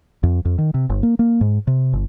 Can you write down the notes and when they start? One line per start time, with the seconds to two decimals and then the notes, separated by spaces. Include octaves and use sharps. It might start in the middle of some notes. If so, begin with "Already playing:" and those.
0.23 F2
0.45 F2
0.58 D#3
0.74 C3
0.90 G1
1.03 A#3
1.19 A#3
1.41 G#2
1.67 C3
1.93 G1